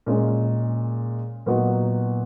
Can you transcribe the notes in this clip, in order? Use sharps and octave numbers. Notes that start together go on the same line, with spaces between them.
A#2 G#3 C#4
A#2 F#3 B3 D#4 F#4